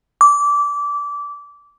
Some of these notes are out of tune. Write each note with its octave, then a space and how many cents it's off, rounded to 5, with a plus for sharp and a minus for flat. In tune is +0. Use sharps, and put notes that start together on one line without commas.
D6 -20